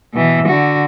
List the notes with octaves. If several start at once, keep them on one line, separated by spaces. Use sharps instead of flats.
B2 E3
D3 F#4